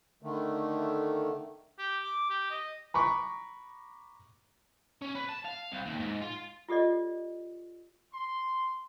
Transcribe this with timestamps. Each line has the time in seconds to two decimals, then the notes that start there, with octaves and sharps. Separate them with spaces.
0.23 D3 D#3 A3
1.79 G4
2.05 D6
2.30 G4
2.51 D#5
2.94 A#5 B5 C#6 D6
5.02 C#4
5.15 B4
5.29 A5
5.45 F5
5.72 C2
5.86 D#2
5.99 G#2
6.21 F4
6.69 F4 G4 A4 D5 D#5
8.12 C6